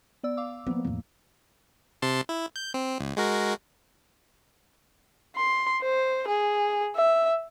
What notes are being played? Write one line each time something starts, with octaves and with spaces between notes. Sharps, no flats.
B3 D5 E6
F5 D6 E6
F3 A#3 B3
E2 A2
C3 A5 C6
E4
G6
C4
C#2
G#3 F#4 A#4
C6
C5
G#4
E5